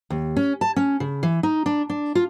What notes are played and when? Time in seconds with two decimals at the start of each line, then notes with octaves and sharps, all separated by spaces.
0.10 D#2
0.37 C#4
0.61 A5
0.76 C#4
1.00 C#3
1.23 E3
1.43 D#4
1.66 D4
1.90 D4
2.15 F4